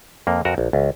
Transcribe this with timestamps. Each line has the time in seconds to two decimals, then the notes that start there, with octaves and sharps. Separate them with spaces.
0.27 F2 A#3
0.45 F2 F#4 A#4
0.58 A#1
0.73 C#2